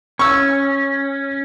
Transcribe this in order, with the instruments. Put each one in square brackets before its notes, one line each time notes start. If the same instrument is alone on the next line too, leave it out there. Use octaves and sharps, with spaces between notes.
[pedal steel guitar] C#4 [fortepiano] C#6 E6